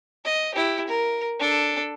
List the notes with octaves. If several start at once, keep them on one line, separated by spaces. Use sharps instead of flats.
D#5
E4 G4
A#4
D4 A4